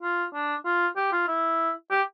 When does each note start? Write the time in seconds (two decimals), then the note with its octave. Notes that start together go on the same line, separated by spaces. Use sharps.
0.03 F4
0.34 D4
0.65 F4
0.96 G4
1.13 F4
1.28 E4
1.91 G4